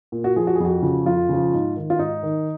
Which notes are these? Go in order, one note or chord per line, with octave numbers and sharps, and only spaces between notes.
A#2
F#4
F3 G#4
F#4
G#4
F2 F#4
C#3 F3
F2 F4
C#3 F3
G#2
D#3
F4
G#2 D#4
D#3